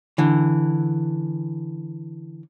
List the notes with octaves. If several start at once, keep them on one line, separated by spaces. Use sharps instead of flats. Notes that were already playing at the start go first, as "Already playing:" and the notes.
D3 E3